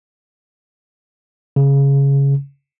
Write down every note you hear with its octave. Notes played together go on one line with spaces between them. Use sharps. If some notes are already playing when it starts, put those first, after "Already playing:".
C#3